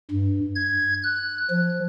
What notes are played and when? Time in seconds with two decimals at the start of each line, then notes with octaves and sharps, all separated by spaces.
0.11 G2
0.55 G#6
1.04 F#6
1.50 F3